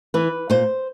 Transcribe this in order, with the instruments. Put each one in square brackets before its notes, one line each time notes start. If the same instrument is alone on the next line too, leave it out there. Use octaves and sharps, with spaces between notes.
[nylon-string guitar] E3 B4
A#2 C5